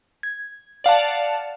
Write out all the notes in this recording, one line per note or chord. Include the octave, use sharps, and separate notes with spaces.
G#6
D5 F5 F#5 A5